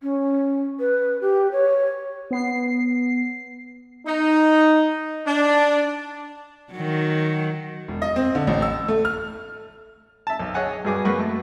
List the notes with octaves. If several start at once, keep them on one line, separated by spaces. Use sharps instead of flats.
C#4
B4
G4
C#5
B3 C7
D#4
D4
D#3 F#3
E1
D#5
C4
D3
A1
E6
A3
F6
E5 A5
B1
G#4 C#5 D#5 F#5 G#5
G2 F#4 G#4 G#5 D6
F#2 A#3 B4 F#5 B5 C#6
A3